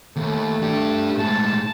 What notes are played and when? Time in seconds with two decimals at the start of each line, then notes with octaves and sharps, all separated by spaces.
0.16 D#2 A3
0.62 D4 G4
1.18 A2 G#3 A5